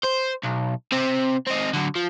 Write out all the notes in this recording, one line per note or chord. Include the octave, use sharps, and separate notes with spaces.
C5
B1
C3 C4
C4 D#4
D3 F#3
F3